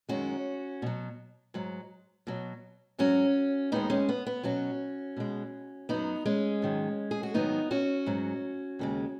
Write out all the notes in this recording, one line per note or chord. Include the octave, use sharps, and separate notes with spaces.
F#2 D#3 G#3 C#4 F#4
B2 F#3
G#2 F#3
B2 F#3
G#2 F#3 C#4 F#4
D#2 D#3 G#3 B3 D#4
G#3 C#4
B3
B3
B2 F#3 C#4 F#4
B2 G#3
F#2 F#3 B3 D#4
G#3 C#4
G#2 D#3 F#3
G#4
F#4
G#2 D#3 F#3 B3 D#4
C#4 F#4
G#2 F#3
D#2 C#3 G#3